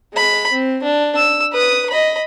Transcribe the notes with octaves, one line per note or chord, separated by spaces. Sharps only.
G#3 B5
C4
D4
E6
B4 D#6
D#5 B5